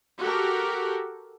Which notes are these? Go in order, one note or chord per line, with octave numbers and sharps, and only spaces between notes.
F#4 G4 A4 A#4